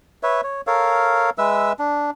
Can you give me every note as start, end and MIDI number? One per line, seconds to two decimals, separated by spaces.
0.23 0.41 71
0.23 0.41 73
0.23 0.41 76
0.44 0.61 73
0.67 1.30 69
0.67 1.30 70
0.67 1.30 73
0.67 1.30 77
1.38 1.73 56
1.38 1.73 71
1.38 1.73 76
1.38 1.73 88
1.79 2.11 62